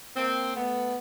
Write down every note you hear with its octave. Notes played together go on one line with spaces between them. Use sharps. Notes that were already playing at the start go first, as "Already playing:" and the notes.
A#3 C4
A3 B3